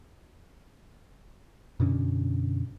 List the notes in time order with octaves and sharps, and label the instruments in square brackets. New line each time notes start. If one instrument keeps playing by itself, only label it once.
[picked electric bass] F#2 B2 D3 C#4